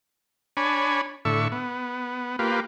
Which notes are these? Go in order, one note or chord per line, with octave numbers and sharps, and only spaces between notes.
D4 C#5 G#5 B5
A2 D3 E5 C#6
B3
A#3 F4 G4 B4